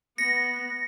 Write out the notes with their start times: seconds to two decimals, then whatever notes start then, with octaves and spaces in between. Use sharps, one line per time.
0.18 B3 A#6 C#7